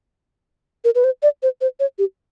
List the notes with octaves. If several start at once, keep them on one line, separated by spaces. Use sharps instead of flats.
A#4
B4
C5
D5
C5
C5
C#5
G4